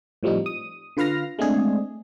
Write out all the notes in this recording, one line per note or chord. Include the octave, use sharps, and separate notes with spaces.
A2 F3 G3 C4 D#4
D#6
D3 F4 B4 F5 F6 A#6
G#3 A3 C4 D4 G#4